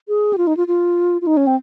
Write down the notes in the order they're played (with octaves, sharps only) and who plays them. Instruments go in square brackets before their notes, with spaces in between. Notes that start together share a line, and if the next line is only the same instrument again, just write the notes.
[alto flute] G#4
G4
F4
D#4
F4
F4
F4
D#4
C#4
C4